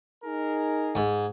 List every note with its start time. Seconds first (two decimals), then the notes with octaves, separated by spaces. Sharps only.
0.24 D#4 G#4 A#4
0.95 G#2